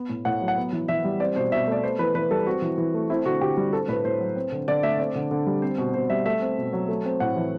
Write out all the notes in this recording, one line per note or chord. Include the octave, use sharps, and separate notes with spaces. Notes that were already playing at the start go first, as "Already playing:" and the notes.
Already playing: B3
A2
A2 F#5
F#3
F#5
B3
E3
E3 E5
G3
C4 D5
B2 C5
B2 E5
A3 D5
B3 C5
E3 B4
E3 B4
G3 A4
C4 F#4
E3
E3
A3
C4 E4
D3 F#4
D3 G4
G3
C4 A4
A2 B4
A2 C5
F#3
C4
D3
D3 D5
A3 E5
C4 D5
D3
D3
G3
C4 C5
B2
B2 C5
G3 E5
A3 E5
C4
B2
F#3
A3
C4
A2 F#5
E3